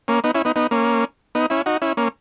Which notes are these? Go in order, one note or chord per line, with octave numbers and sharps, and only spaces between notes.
A#3 C#4
B3 D#4
C#4 E4
B3 D#4
B3 D#4
A#3 C#4
B3 D#4
C#4 E4
D#4 F#4
C#4 E4
A#3 C#4